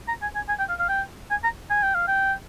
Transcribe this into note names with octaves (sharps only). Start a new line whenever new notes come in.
A#5
G#5
G#5
G#5
G5
F5
F5
G5
G#5
A#5
G#5
G5
F5
G5